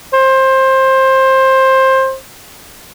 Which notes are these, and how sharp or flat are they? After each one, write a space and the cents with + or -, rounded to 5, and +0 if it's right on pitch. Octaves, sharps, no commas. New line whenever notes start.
C5 +20